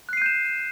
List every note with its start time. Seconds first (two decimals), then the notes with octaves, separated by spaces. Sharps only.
0.09 F#6
0.13 C7
0.17 D#7
0.22 G6
0.26 E7